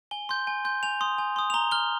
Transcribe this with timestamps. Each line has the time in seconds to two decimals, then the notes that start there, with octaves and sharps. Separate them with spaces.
0.11 G#5 G7
0.29 C6 G6
0.47 G#5
0.65 C6 G6
0.83 G#5 F7
1.01 C6 D#6
1.18 G#5
1.36 C6 D#6
1.50 F7
1.54 A#5 G7
1.71 F6 G7